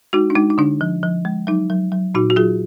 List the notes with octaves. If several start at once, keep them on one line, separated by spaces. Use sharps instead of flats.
G#3 D#4 F#4
D4
G#3 D#4
D#4
D3 D4
F3
F3
G#3
F#3 D#4
F#3
F#3
A#2 D#4 F#4
F#4
F#3 F4 G#4